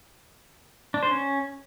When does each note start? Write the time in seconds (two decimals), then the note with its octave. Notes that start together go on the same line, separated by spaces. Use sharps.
0.94 D4
1.03 C5
1.11 C#4